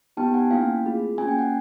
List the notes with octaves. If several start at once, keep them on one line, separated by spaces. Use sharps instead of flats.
B3 D#4 G4 G5 A5
F#5 G#5
A#3 C#4 E4 F5 G5
A3 C4 F4 G#4
A#3 C#4 F#4 G#5
G5
F#5